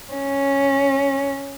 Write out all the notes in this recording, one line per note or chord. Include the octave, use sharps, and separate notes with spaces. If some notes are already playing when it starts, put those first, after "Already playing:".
C#4